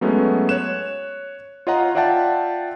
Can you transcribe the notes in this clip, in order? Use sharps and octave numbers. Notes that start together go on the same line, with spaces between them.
F#3 G#3 A3 B3 C#4
C#5 F#6 E7
F4 C#5 D#5 F5 F#5 A#5
F4 D5 E5 F#5 G5 A5